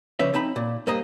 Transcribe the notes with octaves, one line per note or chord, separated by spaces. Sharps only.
C#3 F3 C#4 B4 D5 E5
C4 D#4 A5 B5
A#2
G2 A#3 C5 D#5 A#5